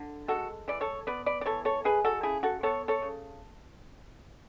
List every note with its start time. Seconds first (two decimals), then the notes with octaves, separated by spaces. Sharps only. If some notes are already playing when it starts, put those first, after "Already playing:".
Already playing: D3
0.28 G#3 F#4 A4
0.68 E3 D5
0.81 A4 C#5
1.07 B3 B4 D5
1.26 B4 D5
1.41 D5
1.46 E3 A4 C#5
1.65 A4 C#5
1.84 G#3 G#4 B4
2.05 F#4 A4
2.23 C#3 E4 G#4
2.43 F#4 A4
2.63 B3 A4 C#5
2.88 A4 C#5
3.02 C#3